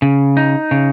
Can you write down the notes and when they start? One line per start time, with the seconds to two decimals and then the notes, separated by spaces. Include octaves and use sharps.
0.02 C#3
0.37 D#4
0.71 C#3